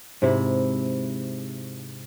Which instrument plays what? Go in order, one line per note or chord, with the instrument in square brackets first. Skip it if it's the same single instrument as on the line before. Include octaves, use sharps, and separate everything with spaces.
[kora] G#2 C3 E4